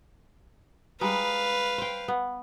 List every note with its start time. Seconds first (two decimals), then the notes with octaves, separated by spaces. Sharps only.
1.01 G3 G#3 D#4 B4 F5
1.78 C5 G5
2.08 B3